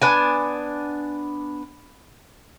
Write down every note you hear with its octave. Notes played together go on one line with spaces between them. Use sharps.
B3 D4 G#5